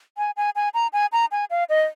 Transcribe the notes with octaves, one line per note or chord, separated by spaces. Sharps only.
G#5
G#5
G#5
A#5
G#5
A#5
G#5
F5
D#5